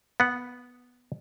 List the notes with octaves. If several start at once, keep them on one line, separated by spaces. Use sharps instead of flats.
B3 F#5